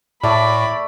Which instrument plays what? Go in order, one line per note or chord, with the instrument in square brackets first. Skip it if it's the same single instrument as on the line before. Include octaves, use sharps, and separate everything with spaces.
[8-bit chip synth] A2 [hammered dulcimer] A3 D6 [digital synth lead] D5 [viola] B5